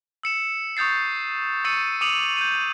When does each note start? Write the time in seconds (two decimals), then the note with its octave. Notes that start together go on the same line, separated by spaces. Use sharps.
0.23 E6 C#7 E7
0.77 C#6 D#6 G6 A6 C7
1.65 C#6 E6 A6 C#7 D#7
2.01 D6 D#6 C#7 D#7 F7 F#7
2.37 G6 D#7